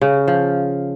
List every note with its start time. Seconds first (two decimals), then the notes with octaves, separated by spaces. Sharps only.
0.01 C#3
0.28 F3